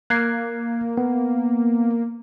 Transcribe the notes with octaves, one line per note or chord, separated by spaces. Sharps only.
A#3 F#6 G#6 C7
B3